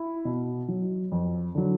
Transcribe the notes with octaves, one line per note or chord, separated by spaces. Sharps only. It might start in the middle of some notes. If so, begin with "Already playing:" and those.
Already playing: E4
B2
F#3
F2
D3 F#3